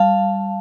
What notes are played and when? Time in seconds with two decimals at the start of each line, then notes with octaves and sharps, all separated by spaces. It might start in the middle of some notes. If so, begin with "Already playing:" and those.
Already playing: G3 F5 A5